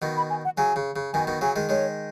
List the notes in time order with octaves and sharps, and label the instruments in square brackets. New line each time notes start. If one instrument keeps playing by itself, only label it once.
[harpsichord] B2 D#3
[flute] B5
G#5
F#5
[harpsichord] C#3 F#3 [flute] G#5
[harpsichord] C#3
C#3
[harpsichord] B2 D#3 [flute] G#5
[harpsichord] B2 D#3
[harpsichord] C#3 F#3 [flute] G#5
[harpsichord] D#3 G#3
[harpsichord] D#3 G#3 [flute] C#5